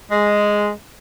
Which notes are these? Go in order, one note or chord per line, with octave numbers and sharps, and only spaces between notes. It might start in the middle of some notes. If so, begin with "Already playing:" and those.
G#3